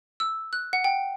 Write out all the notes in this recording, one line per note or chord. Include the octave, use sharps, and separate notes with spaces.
E6
F#6
F#5
G5